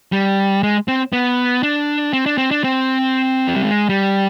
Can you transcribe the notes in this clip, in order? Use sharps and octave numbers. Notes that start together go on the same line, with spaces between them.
G3
G#3
C4
B3
D4
C4
D4
C4
D4
C4
F3
G3
G#3
G3